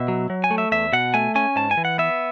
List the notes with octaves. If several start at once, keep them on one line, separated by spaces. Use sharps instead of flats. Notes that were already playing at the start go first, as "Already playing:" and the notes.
Already playing: B2 E5
F#3
F#3
G#5
A3
E5
E2 E5
B2 F#5
A3 G#5
C#4 G#5
G#2 A5
G#5
E3
F#5
B3 E5